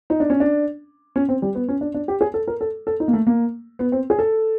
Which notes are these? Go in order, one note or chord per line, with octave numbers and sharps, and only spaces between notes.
D#4
D4
C#4
D4
C#4
C4
G3
B3
C#4
D4
D4
G4
G#4
A4
A#4
A4
A4
D#4
A#3
A3
A#3
B3
C4
G#4
A4